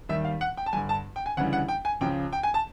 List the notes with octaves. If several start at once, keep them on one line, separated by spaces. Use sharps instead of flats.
D#2 D#3 G3 E5
F5
F#5
G5
A5
G2 D3 G3 G#5
A5
G5
G#5
D2 C#3 E3 G3 F#5
F#5
G5
G#5
C#2 C#3 F3 G5
G5
G#5
A5